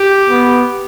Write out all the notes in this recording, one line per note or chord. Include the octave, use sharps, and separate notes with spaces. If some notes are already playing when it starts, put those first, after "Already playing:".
Already playing: G4
B3